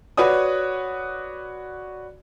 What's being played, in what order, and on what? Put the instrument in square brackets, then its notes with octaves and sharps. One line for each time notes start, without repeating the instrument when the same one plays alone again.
[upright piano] F#4 B4 C#5 D5 D#6